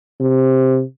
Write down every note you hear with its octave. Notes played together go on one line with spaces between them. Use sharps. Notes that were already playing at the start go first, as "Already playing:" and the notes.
C3